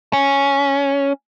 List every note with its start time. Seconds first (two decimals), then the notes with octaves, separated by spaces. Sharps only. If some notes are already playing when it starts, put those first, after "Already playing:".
0.13 C#4